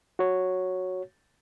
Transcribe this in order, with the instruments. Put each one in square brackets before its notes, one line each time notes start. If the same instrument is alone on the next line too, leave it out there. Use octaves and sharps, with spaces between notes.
[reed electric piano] F#4 C#5